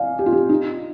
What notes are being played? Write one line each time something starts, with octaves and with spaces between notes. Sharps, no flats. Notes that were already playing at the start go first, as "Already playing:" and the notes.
Already playing: D5 F5 G#5
G4
F4
G4
D#4